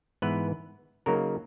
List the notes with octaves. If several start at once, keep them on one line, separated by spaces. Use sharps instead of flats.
G#2 E3 B3 E4 B4
C#3 F#3 A#3 D#4 A#4